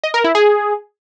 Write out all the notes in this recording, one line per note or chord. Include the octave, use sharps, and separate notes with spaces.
D#5
A#4
E4
G#4